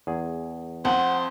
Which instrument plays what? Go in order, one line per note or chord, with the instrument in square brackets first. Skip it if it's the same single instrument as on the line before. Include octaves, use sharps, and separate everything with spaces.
[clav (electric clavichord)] E2 G#4
[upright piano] F2 [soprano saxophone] C5 [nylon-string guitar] F#5